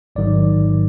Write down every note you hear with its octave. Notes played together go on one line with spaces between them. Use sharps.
A1 G#2 D#3 F#3 D5